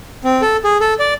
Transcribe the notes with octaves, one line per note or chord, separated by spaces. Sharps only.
C4
A4
G#4
A4
D5